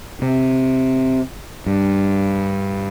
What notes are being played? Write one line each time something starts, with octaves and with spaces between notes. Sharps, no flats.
C3
G2